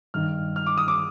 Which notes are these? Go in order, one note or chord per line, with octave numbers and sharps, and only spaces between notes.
G2 D#3 F6
F6
D6
D#6
D6